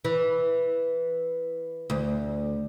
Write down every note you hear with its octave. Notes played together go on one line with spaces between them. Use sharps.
E3
D2